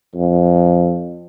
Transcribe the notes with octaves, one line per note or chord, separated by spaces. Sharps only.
F2